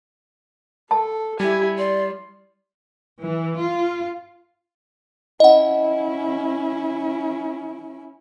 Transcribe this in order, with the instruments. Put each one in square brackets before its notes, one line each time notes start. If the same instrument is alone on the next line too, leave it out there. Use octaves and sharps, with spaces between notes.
[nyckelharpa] A4 [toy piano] A5
[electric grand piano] G3 [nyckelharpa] E4 G#5 [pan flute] G4
[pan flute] D5 [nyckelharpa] C6
[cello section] E3
F4
[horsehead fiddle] C#4 E4 [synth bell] D#5 F#5